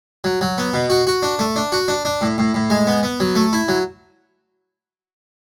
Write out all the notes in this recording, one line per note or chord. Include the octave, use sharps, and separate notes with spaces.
F#3
F#3
B3
B2
F#4
F#4
D4
A3
D4
F#4
D4
D4
A2
A2
A2
G#3
B3
B3
F#3
A3
E4
F#3